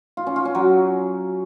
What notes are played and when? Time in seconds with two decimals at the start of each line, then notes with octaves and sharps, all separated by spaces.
0.17 F4
0.27 C#4
0.36 F4
0.45 C#4
0.55 F#3